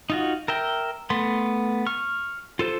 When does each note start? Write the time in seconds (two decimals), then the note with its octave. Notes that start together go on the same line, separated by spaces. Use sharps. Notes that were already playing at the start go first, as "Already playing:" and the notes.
0.10 D#4 F4 F#4
0.48 A#4 E5 G5
1.10 A3 B3 C6
1.86 C#6 F6
2.59 F4 A4 C5